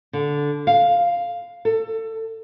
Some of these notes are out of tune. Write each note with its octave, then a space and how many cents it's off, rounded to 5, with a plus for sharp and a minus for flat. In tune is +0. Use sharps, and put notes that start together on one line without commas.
D3 -10
F5 +0
A4 +25